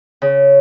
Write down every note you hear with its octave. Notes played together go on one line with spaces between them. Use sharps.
C#3